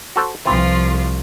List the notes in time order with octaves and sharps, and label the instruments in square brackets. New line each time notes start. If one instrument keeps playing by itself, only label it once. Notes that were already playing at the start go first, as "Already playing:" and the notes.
[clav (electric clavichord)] F#4 A4 C5
[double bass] C2 [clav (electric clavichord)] E3 C4 [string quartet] F3 F4